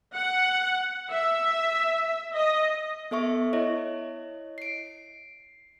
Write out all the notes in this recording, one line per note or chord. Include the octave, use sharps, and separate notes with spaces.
F#5
E5
D#5
B3 A4 E5 C#6
E4 C#5 D#5
C7 D7